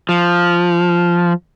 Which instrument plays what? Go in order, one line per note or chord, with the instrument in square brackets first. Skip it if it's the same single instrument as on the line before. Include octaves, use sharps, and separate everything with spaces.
[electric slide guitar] F3